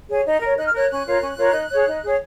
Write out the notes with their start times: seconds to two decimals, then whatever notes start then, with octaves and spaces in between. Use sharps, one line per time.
0.09 G#4 C#5
0.26 D#4
0.41 A#4 C#5
0.58 D#4 F#6
0.65 F6
0.73 A#4 C#5 F#6
0.89 C#4 F#6
1.06 F4 A#4 C#5
1.22 C#4
1.38 F4 A#4 C#5
1.53 D#4
1.70 G#4 C#5
1.86 D#4
2.02 G#4 C#5